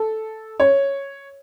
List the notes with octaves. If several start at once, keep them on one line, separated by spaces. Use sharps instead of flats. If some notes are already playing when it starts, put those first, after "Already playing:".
Already playing: A4
C#5